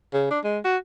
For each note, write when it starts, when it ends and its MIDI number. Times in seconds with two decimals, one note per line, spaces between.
0.14 0.27 49
0.31 0.39 62
0.44 0.59 56
0.65 0.77 66